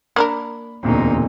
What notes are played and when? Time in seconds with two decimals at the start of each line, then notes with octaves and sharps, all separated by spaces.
0.16 A#3 D4 A#4 B5
0.83 E1 D2 A#2 C4 D#4